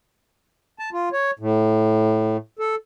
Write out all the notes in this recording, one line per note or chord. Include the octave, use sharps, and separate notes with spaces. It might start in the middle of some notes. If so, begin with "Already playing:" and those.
A5
F4
C#5
A2
A4